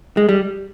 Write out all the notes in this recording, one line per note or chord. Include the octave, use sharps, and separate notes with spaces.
G#3
G3